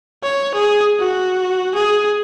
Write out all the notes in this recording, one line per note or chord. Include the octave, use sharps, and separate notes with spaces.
C#5
G#4
F#4
G#4